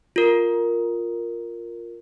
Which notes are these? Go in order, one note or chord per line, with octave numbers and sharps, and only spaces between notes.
F4 A#4